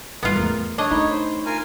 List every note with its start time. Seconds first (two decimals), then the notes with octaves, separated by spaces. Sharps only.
0.23 G#2 G3 B3 F4
0.36 E2 A3 A#4
0.78 D4 C#5 D#5
0.91 A3 D#4 B5
1.10 C5
1.46 F4 A#4 G#5